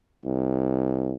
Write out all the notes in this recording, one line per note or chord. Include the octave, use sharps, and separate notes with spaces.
C2